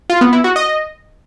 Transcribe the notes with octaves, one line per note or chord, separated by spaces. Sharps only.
F4
B3
E4
F#4
D#5